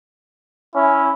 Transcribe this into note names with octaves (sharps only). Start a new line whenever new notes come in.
C#4 E4